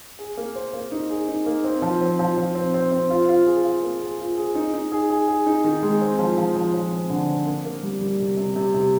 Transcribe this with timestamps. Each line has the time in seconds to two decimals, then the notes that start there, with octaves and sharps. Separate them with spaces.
0.19 G#4
0.37 A#3
0.56 C5
0.74 A#3
0.92 D#4
1.10 G#4
1.28 D#4
1.46 A#3
1.64 C4
1.82 F3
2.01 C4
2.19 F3
2.37 F3
2.55 C4
2.74 C4
2.92 C4
3.10 F4
3.28 F4
3.46 G#4
3.65 F4
3.83 A#3
4.01 G#4
4.19 F4
4.38 G#4
4.55 D#4
4.74 D#4
4.92 G#4
5.10 G#4
5.28 G#4
5.46 D#4
5.64 D#3
5.83 G#3
6.01 C4
6.19 F3
6.38 F3
6.56 F3
6.74 F3
6.92 C4
7.10 D3
7.28 C4
7.47 A#3
7.65 A#3
7.83 G3
8.01 G3
8.19 C3
8.37 C3
8.56 C3
8.74 C3